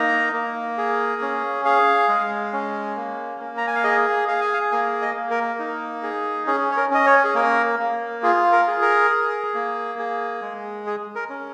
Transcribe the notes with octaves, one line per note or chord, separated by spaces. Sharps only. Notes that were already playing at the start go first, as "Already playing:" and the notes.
Already playing: A#3 D#4 A#5
A#3
G#4
C#4
G#4 F5
G#3
C#4
A#3
A#3
A#5
G#5
F5
G#4 D#5
G#4 F5
G#5
F5
A#3 G#5
D#5
A#3
A#4
D#4
G#4
C#4 G#4
C#5
A#4
C#4 D#5
C#5
G#4
A#3 A#4
A#3
F4 G#4
A#4
G#4
A#4
G#4
A#3
G#4
G#3
G#4
A#4
C#4